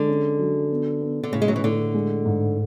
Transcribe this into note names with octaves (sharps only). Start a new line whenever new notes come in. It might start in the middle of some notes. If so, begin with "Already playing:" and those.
Already playing: D3 G#3
C#4
F#3
B3
B3
D3
A2 C#3
G#3
F#3
E3
A2 D3
G#3
G#2